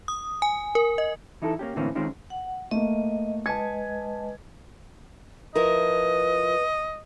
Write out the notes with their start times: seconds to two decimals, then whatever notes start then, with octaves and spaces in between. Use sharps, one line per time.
0.08 D#6
0.42 G#5
0.75 A#4
0.98 D#5
1.42 E3 D#4 E4 A4
1.59 A#3 C#4 G4
1.76 A2 D3 E3 A#3 C4 C#4
1.95 D#3 F3 G#3 C4 C#4 D#4
2.30 F#5
2.71 A3 A#3 D#5
3.46 G#3 B4 D#5 A5 G#6
5.55 F3 E4 A#4 B4 D#5